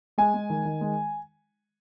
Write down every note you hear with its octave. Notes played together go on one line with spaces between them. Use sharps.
G#3 G#5
G#3
D#3
D#3
G#3